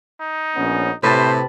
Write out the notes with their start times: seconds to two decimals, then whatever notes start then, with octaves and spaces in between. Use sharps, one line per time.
0.21 D#4
0.55 A#1 B3 C#4
1.03 A2 C3 B4 C5 A5